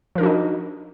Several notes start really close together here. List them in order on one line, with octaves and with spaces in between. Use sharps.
F3 A#4 D4 F#4 D#4